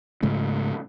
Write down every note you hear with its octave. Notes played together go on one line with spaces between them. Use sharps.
G#2 C#3 G#3 A3